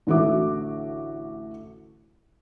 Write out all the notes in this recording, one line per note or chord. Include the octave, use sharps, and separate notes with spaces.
A1 D3 F#4 A4 E5 D6